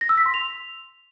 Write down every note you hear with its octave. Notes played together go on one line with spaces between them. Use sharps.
A#6
E6
B6
C6
F7